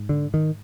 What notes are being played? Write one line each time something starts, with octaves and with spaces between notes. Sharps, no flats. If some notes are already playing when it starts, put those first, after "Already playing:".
Already playing: G#2
D3
D#3